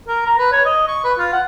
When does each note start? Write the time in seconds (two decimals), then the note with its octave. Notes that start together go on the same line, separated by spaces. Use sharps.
0.08 A#4
0.26 A#5
0.39 B4
0.52 C#5
0.65 D#5
0.88 C#6
1.04 B4
1.19 F4
1.33 F#5